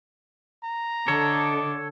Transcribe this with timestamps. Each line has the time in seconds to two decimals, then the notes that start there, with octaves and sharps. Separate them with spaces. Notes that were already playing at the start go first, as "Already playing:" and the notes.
0.64 A#5
1.08 D3 A4 C#5 D#5 D6